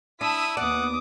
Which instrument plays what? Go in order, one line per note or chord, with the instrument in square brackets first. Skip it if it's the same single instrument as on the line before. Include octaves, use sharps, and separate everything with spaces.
[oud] D4 [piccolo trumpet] E4 [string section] D#6 E6 B6
[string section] D#2 B3 [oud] D5 [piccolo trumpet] F#5 [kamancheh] D6 D#6